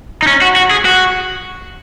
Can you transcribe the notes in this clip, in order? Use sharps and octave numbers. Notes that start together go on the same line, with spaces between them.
D#4
C#4
F#4
F#4
G#4
F#4